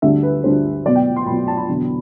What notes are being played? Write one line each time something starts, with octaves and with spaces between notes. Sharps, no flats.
D2 D3 G3 D4 E5
B4
D2 D3 G3 D4 C5
B1 B2 F#3 D5
G5
C6
B1 B2 F#3 B5
A5
B5
E1 E2 D3 F#3